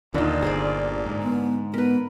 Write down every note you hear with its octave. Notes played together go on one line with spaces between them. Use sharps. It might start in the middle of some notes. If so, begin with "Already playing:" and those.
D#2 A#2 D3 D#4
G1 G#4 C5 D5
G#2
B3
B3 A#4 B4